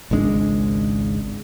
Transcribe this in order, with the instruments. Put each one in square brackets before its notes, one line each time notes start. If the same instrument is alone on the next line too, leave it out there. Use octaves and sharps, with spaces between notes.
[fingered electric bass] G#1 C#2 G#3 D4